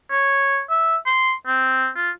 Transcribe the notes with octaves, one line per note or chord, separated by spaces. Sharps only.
C#5
E5
C6
C4
F4